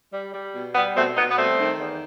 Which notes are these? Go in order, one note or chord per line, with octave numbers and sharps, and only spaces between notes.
G3
G3
B2
G3 B3
B2 A3 C4
B2 B3 D#4
B3
G3 A3 C4
D#3
E2